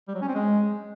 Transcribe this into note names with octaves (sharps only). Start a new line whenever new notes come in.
G3
F#3
C#4
C4
G#3